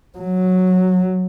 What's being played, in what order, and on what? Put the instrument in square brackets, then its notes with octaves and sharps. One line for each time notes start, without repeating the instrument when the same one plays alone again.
[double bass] F#3